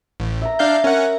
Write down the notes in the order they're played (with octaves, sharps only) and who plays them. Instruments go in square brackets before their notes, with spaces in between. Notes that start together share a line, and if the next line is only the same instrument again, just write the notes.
[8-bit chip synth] A1
[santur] E5 A#5
[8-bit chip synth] D4 F5 G6
[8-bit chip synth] C#4 F#5 [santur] A#4